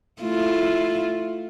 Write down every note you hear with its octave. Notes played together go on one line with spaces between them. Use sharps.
A3 E4 F4